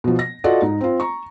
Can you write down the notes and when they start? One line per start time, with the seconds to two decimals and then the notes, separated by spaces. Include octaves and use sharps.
0.04 B2 F3
0.19 A#6
0.44 F4 F#4 A4 D5 D#5 F#5
0.62 G#2 D#4
0.81 C4 F4
1.00 A#5 C#6